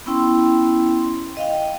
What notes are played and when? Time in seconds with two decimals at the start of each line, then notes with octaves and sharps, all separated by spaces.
0.06 B3 C#4 E4 G5 C6
1.37 D#5 F5 G5